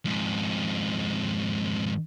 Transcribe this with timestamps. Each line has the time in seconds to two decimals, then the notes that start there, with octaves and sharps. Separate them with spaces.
0.05 F2 G#2